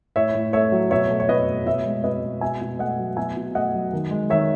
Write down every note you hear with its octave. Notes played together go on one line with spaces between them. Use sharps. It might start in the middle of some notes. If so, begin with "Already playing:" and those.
A2 C#5 E5
A2
A3 C#5 E5
F#3
B2 C#5 E5
A3
C#5
B2 B4 D#5
A3
B2 C#5 E5
G#3
B2 B4 D#5
G#3
B2 E5 G#5
B2
A3 D#5 F#5
F#3
B2 E5 G#5
B2
A3 D#5 F#5
F#3
D#3
G#3
D#3 C#5 E5